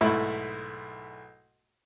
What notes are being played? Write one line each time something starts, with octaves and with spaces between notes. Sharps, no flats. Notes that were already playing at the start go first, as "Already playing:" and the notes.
B1 G#2 A3 E4 B5